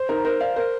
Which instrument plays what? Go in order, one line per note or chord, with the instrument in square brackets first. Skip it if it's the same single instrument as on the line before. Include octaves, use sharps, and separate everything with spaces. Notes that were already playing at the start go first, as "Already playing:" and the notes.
Already playing: [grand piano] C5
[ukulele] D#4 [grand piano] A#4
[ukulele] A#4 [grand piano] C5
[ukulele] D5 [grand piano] F5
[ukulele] A#4 [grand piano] C5